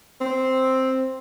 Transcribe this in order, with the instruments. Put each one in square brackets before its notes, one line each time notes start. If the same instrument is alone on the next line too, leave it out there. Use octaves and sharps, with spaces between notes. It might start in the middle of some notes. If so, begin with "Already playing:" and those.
[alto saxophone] C4